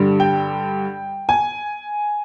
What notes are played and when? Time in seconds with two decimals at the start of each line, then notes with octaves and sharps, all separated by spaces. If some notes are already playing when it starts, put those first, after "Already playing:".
Already playing: G2 D3 G3
0.20 G5
1.29 G#5